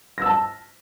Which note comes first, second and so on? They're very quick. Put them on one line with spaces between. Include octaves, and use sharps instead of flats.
A#6 E6 A5